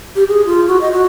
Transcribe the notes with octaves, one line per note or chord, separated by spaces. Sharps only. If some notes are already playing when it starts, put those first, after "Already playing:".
G4
G#4
F4
F#4
D#5
F#4